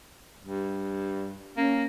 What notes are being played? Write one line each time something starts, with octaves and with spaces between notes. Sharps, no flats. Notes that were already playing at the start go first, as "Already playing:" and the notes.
G2
A#3 C#4